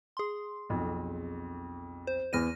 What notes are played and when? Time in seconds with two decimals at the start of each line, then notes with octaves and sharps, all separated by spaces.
0.17 G#4 C6
0.69 B1 F2
2.07 C5
2.33 E2 B3 F6 A#6 D#7